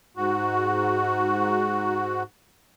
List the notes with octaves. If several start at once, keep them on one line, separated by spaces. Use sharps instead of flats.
G#2 F#4